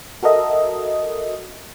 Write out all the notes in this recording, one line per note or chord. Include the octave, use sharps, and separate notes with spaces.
F#4 A4 A#4 D#5 E5